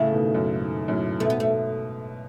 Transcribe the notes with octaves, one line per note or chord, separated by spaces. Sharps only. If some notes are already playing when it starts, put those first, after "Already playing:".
Already playing: A2 C#3 A3
B2 D#3
F#2
G#2
F#2 A2
G#2 B2 A3
B3
A3